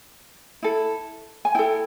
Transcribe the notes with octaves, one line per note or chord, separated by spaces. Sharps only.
E4 A4
G#5
E4 A4 G5